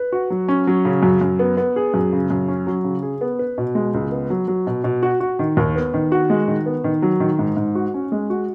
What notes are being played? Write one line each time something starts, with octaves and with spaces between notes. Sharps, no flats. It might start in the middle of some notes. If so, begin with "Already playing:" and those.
Already playing: B4
F#4
F#3
C#4
F#3
C#3
F#2
F#2
B3
B3
G#4
F#2
C#3
F#2
C#4
F#3
C#3
G#4
B3
B4
B2
G#3
C#2
B3
F#3
F#3
B2
B2
F#4
F#4
D#3
D#2
B3
D#3
F#4
G#3
D#3
B3
D#3
F#3
D#3
G#2
G#2
F#4
C#4
G#3
F#4